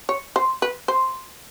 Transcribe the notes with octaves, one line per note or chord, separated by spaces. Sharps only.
C#5
C5
B4
C5